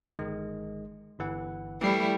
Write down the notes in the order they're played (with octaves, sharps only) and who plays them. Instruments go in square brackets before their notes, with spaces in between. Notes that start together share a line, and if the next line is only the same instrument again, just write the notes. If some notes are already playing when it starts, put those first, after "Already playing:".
[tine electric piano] G1 D#3 G#3
G1 E3 F#5
[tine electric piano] E3 C7 [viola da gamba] G3 A3 E4